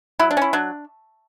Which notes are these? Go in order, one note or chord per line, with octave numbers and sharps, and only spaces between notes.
F#3 E4
D4
C#4 E4
F#3 D4